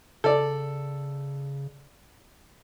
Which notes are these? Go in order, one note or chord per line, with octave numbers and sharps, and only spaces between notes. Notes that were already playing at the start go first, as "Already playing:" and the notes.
C#3 A4 D5